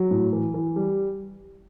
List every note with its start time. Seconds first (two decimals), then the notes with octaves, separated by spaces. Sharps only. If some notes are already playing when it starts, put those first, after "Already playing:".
Already playing: F#3
0.11 A2
0.33 E3
0.54 E3
0.76 G3